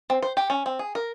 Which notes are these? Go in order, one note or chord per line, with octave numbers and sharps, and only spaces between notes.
C4
C5
G4
C#4
C4
G#4
A#4